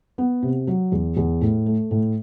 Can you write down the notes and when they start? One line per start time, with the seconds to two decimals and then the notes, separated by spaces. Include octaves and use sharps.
0.18 B3
0.43 C3
0.67 F#3
0.92 E2
1.17 E2
1.41 A2
1.66 A3
1.91 A2